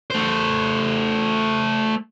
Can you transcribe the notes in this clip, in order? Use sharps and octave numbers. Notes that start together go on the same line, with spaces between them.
A3 C5